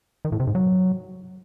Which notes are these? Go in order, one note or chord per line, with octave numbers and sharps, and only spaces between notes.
D#3
A2
C3
G#2
F#3